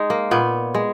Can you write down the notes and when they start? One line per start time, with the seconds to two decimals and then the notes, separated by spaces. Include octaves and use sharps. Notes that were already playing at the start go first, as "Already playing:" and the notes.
Already playing: G#3 D#4
0.10 A#3
0.31 A#2 B3
0.74 G#3